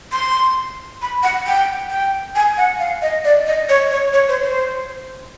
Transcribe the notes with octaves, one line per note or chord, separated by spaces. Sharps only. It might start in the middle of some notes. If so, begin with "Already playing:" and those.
C6
B5
F#5
G5
G5
G#5
F#5
F5
D#5
D5
D#5
C#5
C#5
C#5
C5
C5